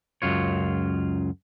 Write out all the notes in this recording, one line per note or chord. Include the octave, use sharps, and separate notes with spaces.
C#2 F#2 F4 C#5